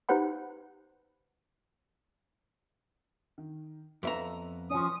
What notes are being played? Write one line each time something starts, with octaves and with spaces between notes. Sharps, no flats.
D#4 G4 B4 C5 F#5 B5
D#3
F2 B3 A4 B4 E5 A#5
F3 C#4 D#6